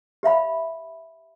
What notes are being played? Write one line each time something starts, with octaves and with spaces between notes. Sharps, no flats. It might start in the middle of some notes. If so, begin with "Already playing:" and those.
G4 E5 F5 B5